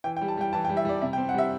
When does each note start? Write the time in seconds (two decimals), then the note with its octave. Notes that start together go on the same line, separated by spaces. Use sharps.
0.04 E3 G5
0.17 G5
0.21 G3
0.28 A5
0.37 G3 G5
0.53 E3 A5
0.65 G5
0.69 G3
0.77 E5
0.85 G3 D5
1.02 C3 E5
1.13 G5
1.18 C4
1.29 F#5
1.34 G3 E5